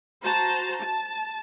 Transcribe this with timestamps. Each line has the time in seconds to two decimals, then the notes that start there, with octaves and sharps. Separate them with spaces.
0.23 F#4 C5 A5 A#5
0.78 A5